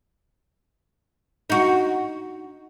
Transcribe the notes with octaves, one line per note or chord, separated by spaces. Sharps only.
D#4 F#4